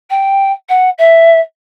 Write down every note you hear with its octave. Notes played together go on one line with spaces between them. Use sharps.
G5
F#5
E5